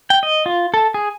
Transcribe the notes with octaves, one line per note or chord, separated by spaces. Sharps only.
G5
D#5
F4
A4
G#4